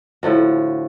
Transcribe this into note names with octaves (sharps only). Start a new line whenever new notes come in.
A2 D3 F3 F#4